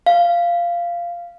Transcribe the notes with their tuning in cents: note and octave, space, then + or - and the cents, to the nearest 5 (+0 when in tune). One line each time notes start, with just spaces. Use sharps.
F5 -10